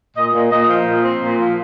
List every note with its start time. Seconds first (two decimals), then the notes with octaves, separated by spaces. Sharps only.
0.16 A#2 D#5
0.33 A#2
0.51 A#2 D#5
0.68 F3
0.87 A#2
1.04 C4
1.22 A#2
1.40 F3